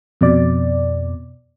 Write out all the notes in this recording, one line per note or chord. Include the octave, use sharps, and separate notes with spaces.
F2 B2 D5